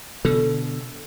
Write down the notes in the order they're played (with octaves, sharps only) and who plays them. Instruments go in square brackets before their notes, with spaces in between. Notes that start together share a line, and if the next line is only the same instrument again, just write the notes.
[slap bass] B2 D3 [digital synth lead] A4